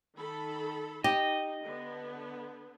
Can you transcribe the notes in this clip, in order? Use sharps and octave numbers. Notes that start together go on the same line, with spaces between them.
D#3 A4 B5
D#4 G4 D#5
D3 B3